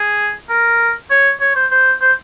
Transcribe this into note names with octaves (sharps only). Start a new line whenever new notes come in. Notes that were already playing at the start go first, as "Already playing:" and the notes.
Already playing: G#4
A#4
C#5
C#5
C5
C5
C5